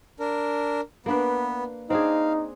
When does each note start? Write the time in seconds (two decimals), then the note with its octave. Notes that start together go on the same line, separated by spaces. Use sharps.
0.20 D4 A#4
1.06 A#3 B3 D4 B4
1.90 C4 D4 D#4 G#4 F5